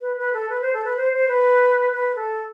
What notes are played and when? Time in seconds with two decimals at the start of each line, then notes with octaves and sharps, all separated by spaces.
0.01 B4
0.17 B4
0.33 A4
0.49 B4
0.61 C5
0.73 A4
0.84 B4
0.96 C5
1.13 C5
1.28 B4
1.92 B4
2.15 A4